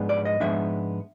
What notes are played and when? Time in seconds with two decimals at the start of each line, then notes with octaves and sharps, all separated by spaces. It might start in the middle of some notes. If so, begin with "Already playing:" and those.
Already playing: G#2 F3 G#3 B3 D4
0.09 D5
0.25 D#5
0.40 G#2 F3 G#3 B3 D4 E5